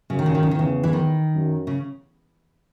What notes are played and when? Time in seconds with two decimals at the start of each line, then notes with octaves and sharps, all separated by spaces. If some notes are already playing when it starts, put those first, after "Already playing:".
0.10 F#2 C#3
0.19 D#3
0.26 C#3
0.35 D#3
0.43 C#3
0.51 E2 D#3
0.59 C#3
0.83 E3
0.93 D#3
1.35 F#2
1.67 C#3